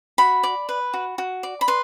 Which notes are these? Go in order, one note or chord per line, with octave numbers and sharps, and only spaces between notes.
F#4 B5
D5
B4
F#4
F#4
D5
B5
B4 C6